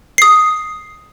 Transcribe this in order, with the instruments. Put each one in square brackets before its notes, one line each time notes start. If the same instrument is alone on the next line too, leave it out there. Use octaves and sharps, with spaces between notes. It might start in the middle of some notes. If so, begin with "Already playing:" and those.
[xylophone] D#6 C7